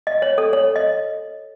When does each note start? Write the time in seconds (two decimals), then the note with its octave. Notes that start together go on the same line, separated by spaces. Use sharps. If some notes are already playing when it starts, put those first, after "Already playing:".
0.07 D#5
0.22 C#5
0.38 A4
0.53 C#5
0.76 D#5